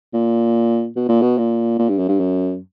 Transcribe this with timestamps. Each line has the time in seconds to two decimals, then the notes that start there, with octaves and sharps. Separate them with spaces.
0.14 A#2
0.96 B2
1.09 A#2
1.22 B2
1.38 A#2
1.79 A#2
1.89 G2
1.99 F#2
2.09 G2
2.20 F#2